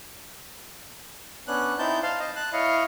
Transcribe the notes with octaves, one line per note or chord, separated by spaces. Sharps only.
B3 C#4 D4 F#6
C4 D#4 E4 A5 G6
C5 F5 A5
D#5
A5 F#6
E4 C#5 D#5 F5